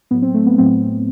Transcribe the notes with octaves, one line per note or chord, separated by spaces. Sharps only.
A2 F#3 B3
C4
A3
B3
A2 F#3 C4